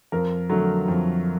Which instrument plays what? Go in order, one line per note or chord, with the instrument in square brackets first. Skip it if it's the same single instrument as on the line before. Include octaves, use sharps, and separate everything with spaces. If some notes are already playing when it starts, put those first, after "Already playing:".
[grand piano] F2 A#4
D3 F#3 A3
F2